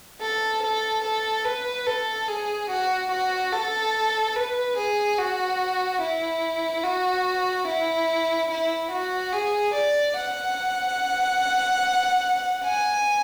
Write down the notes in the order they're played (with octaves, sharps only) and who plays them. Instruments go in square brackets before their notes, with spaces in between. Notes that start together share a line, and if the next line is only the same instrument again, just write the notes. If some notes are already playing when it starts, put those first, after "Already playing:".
[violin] A4
A4
A4
B4
A4
G#4
F#4
F#4
A4
B4
G#4
F#4
E4
F#4
E4
E4
F#4
G#4
D5
F#5
G#5